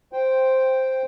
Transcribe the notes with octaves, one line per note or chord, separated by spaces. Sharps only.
C5 G5